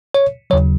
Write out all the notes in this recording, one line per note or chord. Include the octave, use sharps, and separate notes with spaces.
C#5
D#2 C#3 F#3 C#5